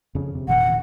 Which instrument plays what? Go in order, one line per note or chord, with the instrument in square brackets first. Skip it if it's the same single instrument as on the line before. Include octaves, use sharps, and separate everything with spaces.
[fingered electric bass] F2 C#3
C3
[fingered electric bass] E1 A#2 D#3 [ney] F#5